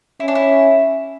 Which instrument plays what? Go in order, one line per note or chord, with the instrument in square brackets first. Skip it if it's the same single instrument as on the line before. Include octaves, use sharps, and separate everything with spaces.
[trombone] C#4 [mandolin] E4
[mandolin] D4
E4